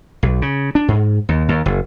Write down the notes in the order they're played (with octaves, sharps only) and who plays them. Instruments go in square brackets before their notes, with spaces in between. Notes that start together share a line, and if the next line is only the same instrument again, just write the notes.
[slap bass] B1
C#3
D4
G#2
D#2
D#2
F#1